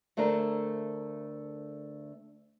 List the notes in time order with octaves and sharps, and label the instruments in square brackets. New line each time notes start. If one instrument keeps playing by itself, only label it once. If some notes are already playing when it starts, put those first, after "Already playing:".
[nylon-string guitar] D2 A3 D4 A#4 C5